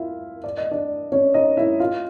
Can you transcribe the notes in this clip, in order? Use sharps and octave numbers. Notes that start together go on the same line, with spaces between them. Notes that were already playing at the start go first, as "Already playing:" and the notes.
Already playing: E4 F4 E5 F5
D5
D#5
D4 D5
C#4 C#5
D#4 D#5
E4 E5
F4 F5